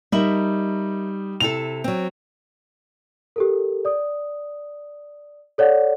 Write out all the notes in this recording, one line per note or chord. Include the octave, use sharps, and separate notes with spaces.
G3 D#4 A#4 E5 F#7
C3 E4 A4 F7
F#3 C4
G4 A4 A#4
D5 D#6
A4 C#5 D5 F#5